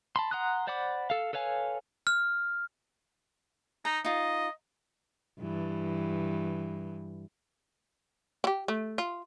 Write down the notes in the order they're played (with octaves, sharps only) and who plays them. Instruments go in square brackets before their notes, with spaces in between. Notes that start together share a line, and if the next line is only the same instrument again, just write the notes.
[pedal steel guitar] A5 B5 C6
F#5 A#5 C6 D#6 F#6
C5 D5 F#5 B5 D6
A4 F5
A4 B4 C#5 F5 G#5
[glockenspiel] F6
[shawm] D#4 [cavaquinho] A#5
[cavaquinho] D#4 F4 [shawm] D#5
[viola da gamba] G2 E3
[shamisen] E4 G4
A3
F4